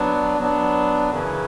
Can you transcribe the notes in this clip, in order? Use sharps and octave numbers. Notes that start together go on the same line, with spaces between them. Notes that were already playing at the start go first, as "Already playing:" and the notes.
Already playing: F#3 B3 D4
F#3 B3 D4
F#2 C#3 E3